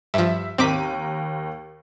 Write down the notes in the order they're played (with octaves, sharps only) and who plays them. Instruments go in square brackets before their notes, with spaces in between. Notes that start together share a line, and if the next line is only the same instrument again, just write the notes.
[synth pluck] G2 F3 [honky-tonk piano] E5
[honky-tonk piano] D#2 A#4 D#7 [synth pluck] C4 D6 B6